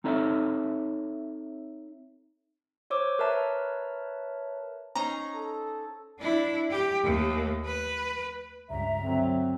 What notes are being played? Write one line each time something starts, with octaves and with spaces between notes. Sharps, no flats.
C4 D#4 A4 C#5 E5
C5 C#5 D6 E6
A#4 B4 C#5 E5 A5 A#5
C#4 D#4 C5 A#5
A4
D4 E4
G4
D#2 A3
B4
C#2 G2 E5 A#5
D3 F#3 C4